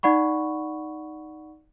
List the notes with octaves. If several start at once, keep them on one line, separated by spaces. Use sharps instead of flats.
D#4 D5 F#5 B5 C#6